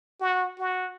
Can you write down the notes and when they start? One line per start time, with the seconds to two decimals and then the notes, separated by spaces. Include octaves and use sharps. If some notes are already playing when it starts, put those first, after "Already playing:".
0.20 F#4
0.60 F#4